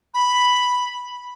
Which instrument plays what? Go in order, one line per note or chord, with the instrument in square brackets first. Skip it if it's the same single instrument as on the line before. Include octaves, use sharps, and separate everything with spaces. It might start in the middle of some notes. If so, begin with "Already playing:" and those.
[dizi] B5